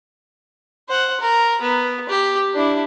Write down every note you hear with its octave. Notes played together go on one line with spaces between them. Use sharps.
C5 F#5
A#4
B3
G4
D4 E4